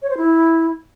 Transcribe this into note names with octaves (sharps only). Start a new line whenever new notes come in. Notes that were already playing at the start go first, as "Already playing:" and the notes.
C#5
C5
E4